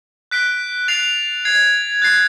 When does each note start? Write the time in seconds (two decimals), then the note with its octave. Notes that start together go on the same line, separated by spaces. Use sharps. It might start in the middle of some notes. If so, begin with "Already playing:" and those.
0.31 F#6 B6 D7 G7
0.88 F#6 A6 C7 F7
1.45 G#6 C7 F7
2.02 F#6 A6 C7